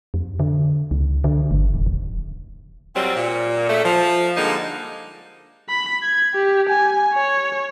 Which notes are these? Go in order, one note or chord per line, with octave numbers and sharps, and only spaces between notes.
F2
D3
C#2
D3
G1
D#1
D#1
A#2 F#3 G3 C4
A#2
C#3 A3
F3
D3 G3 G#3 A#3 D#4
B5
G#6
G4
G#5
C#5